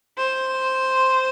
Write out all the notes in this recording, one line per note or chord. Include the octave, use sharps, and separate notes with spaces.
C5